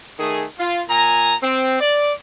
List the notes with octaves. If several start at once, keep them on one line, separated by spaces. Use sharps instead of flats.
D#3 A3 G#4
F4
A#2 G#5 A#5
C4
D5